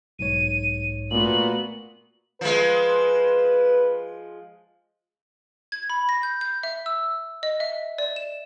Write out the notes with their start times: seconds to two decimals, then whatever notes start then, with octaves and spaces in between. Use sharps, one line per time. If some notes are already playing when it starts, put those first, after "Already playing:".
0.19 B1 G#2 C#5 D#7
1.11 A#2 A3 B3 F#4 F#7
2.41 F3 G#3 B4
5.72 G#6
5.90 B5
6.09 A#6
6.23 G6
6.41 G6
6.63 E5
6.86 E6
7.43 D#5
7.60 E5
7.98 D5
8.16 E7